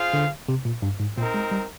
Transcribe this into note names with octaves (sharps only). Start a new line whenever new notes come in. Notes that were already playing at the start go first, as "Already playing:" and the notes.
Already playing: F4 G#4 C5 F5
D3
C3
A#2
G2
G#2
A#2 C4 D#4 A#4
G#3
G3